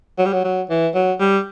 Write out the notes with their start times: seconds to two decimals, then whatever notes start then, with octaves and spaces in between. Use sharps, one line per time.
0.18 F#3
0.26 G3
0.33 F#3
0.44 F#3
0.70 E3
0.94 F#3
1.20 G3